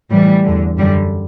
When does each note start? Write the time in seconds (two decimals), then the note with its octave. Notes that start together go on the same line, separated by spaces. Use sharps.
0.10 A2 E3 G3
0.44 E2 D3
0.77 F#2 D3 G3